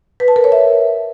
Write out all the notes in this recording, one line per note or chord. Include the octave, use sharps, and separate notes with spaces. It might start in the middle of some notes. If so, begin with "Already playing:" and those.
B4
A5
A#4
C#5
E5